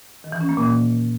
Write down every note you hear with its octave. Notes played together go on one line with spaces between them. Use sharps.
D#3
E3
C#4
A#3
A#2